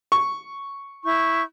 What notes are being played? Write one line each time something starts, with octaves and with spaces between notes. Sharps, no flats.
C#6
E4 C#6 G6